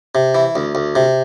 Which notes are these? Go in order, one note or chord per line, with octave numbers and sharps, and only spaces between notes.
C3
E3
D2
D2
C3